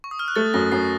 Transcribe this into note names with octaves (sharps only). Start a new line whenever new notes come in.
C#6
D#6
F6
F#6
A3 A6
F#2 A#6
F#2 C7